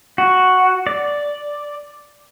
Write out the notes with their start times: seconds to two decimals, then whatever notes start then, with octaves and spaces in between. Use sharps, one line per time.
0.18 F#4
0.87 D5